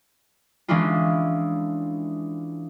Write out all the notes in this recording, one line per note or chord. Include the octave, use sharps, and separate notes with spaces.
E3 G#3 C#4 D4 E4 F4